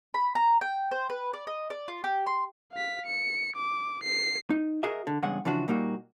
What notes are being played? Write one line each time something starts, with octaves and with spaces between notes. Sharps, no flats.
B5
A#5
G5
C5
B4
D5
D#5
D5
F4
G4
C6
F5 B6
C#7
D6
C7
D#4
F#4 G#4 A#4 D#5 E5
D3
E2 G2 C#3 G#3 G#4 F#5
C#3 E3 F3 D4 F#4
A#2 G3 A#3 D#4 F#4